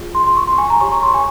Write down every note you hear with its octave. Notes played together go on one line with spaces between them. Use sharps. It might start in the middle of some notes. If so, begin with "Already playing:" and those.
Already playing: F4 G#4
C6
C6
C#6
C6
G#5
A#5
G4 C#5 C#6
C#6
C6
G#5